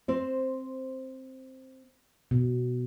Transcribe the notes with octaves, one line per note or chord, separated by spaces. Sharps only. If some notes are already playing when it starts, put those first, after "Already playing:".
C4 C5
B2